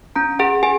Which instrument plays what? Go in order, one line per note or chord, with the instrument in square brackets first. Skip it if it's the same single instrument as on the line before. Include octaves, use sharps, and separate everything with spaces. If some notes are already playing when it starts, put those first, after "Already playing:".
[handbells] C#4 A#5
G#4 F#5
G#4 G#5